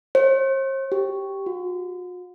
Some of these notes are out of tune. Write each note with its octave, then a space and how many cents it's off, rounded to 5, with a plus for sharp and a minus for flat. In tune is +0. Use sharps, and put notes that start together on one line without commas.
C5 +45
G4 -5
F#4 -45